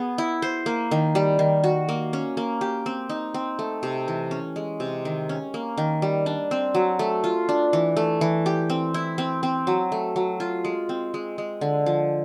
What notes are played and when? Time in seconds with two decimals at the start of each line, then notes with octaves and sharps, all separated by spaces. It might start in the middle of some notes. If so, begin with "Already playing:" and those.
Already playing: B3 G#4
0.18 E4
0.42 C5
0.66 A#3
0.91 D#3
1.15 G3
1.39 D#3
1.64 F#4
1.89 A#3
2.13 C#4
2.37 A#3
2.61 G4
2.86 C4
3.09 D#4
3.34 C4
3.59 A3
3.83 C3
4.08 E3
4.31 C#4
4.56 G#3
4.80 C3
5.05 D#3
5.29 C#4
5.54 A#3
5.78 D#3
6.02 G3
6.26 D4
6.51 C4
6.74 F#3
6.99 A3
7.24 F4
7.49 D4
7.73 E3
7.97 A3
8.21 E3
8.46 G4
8.70 C4
8.94 E4
9.18 C4
9.43 C4
9.67 F#3
9.92 A3
10.16 F#3
10.40 F4
10.65 G#3
10.89 C4
11.14 G#3
11.38 G#3
11.61 D3
11.86 F3